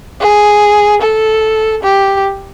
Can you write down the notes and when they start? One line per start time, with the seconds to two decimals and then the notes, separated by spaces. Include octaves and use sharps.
0.21 G#4
1.01 A4
1.83 G4